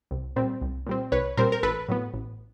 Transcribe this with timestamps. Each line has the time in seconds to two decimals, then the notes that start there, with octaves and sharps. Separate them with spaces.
0.11 C2
0.36 A#2 G3 C4
0.62 C2
0.87 A#2 G3 C4
1.12 C2 B4 C#5
1.37 A#2 G3 C4 A#4 C5
1.52 A#4
1.63 A1 A4 B4
1.88 A2 F#3 B3
2.14 A1